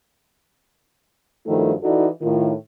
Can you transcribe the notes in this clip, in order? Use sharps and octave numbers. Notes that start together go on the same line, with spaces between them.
G2 D#3 F3 A3 E4 F#4
E3 D#4 E4 F#4 A4 D5
A2 D#3 F4